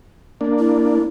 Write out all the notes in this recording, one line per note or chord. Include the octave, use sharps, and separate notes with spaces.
A#3 D4
E4